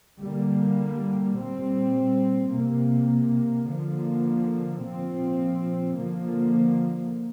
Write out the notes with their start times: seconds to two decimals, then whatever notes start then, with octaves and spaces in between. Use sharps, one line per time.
0.20 D3 G3 A#3
1.35 A#2 G3 C4
2.52 C3 A#3
3.67 D3 F3 A#3
4.82 A#2 F3 C4
5.98 D3 F3 A#3